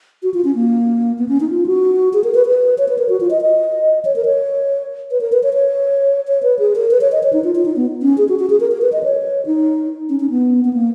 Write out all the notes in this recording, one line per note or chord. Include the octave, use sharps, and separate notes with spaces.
F#4
F4
C#4
A#3
B3
C#4
D#4
F4
F#4
G#4
A#4
B4
B4
C#5
B4
A#4
F#4
F4
D#5
D#5
C#5
A#4
C#5
B4
A#4
B4
C#5
C#5
C#5
B4
G#4
A#4
B4
C#5
D#5
C#5
D#4
F4
F4
D#4
B3
C#4
G#4
F#4
F#4
G#4
A#4
A#4
B4
D#5
C#5
D#4
C#4
C#4
B3
B3
A#3